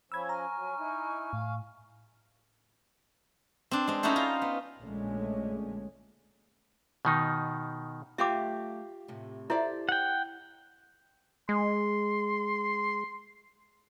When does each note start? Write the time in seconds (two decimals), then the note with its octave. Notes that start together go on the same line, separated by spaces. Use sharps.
0.12 F3 C#4 B5 E6 G#6
0.29 G#5 A#5 C#6 F6
0.56 F#3
0.78 D#4 E4
1.33 A2 F5
3.71 C4 D4
3.87 G#3 C4
4.03 C#4 D#4 E4 F#4 A4 C5
4.16 F4 A#5
4.42 B3
4.80 A#1 A#2 D3 G#3 A3 C#4
7.05 B2 D#3 D#4
8.18 F#3 A3 F4 G4 E5 F5 D6
9.08 A2 C3
9.50 E4 G4 A4 C5 D5 E5
9.89 F#5 G5
11.49 G#3 C6